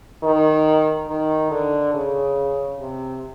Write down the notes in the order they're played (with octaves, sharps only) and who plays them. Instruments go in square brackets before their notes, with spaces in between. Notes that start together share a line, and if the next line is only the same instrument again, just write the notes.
[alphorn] D#3
D#3
D3
C#3
C3